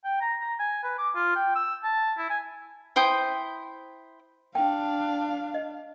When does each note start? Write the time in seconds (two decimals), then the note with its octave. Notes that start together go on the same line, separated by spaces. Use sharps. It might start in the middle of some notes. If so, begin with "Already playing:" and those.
0.04 G5
0.21 A#5
0.41 A#5
0.59 G#5
0.84 B4
0.98 D6
1.15 F4
1.35 G5
1.55 E6
1.83 A5
2.17 E4
2.30 G#5
2.96 E4 C5 G5 D#6
4.55 D4 F5 G5
5.54 D#5